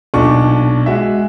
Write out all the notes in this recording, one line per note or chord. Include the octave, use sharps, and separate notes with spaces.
B1 A#2 D4 C#6
G#3 F#4 E5